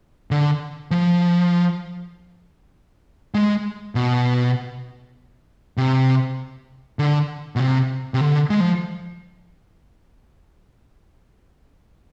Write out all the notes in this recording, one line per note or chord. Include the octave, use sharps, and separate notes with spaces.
D3
F3
G#3
B2
C3
D3
B2
C3
C3
D3
G#3
F3